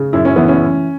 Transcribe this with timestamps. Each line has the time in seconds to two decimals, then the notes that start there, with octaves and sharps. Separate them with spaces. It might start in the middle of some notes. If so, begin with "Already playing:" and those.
Already playing: C#3
0.13 F#2 E4
0.25 C#4
0.36 E3 B3
0.48 C#4